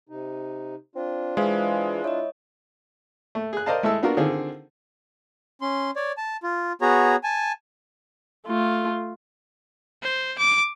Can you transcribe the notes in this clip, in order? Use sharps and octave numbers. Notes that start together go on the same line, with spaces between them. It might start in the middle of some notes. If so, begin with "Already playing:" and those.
C3 D#4
C4 D4 F4
E3 G#3 C5 F5
E4 C#5 D#5
A3
G#4 F#6
A#4 C5 D5 D#5 F5 A5
G#3 A3 E4 A4 E6
B3 D4 F4 F#4 A#4
D3 D#3 C4 F4 G#4
C#4 C6
C#5 D5
A5
F4
B3 F#4 G#4 C#5 A#5
G#5 A5
A3 F4
C5
D6